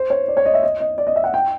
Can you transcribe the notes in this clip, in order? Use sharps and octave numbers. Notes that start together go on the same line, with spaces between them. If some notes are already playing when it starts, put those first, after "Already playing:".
Already playing: C5
C#5
D5
C#5
D#5
E5
D#5
D#5
D5
D#5
E5
F#5
G5